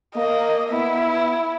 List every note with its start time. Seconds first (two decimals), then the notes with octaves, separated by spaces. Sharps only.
0.16 A#3 D#5
0.70 B3 E4